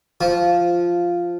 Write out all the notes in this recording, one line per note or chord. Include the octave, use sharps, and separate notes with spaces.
F3